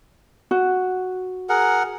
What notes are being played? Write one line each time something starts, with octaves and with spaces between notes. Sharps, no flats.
F#4
G#4 A#4 F#5